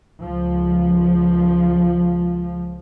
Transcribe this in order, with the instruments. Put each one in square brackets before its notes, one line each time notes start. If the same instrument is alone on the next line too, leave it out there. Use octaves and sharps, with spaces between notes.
[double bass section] C#2 F3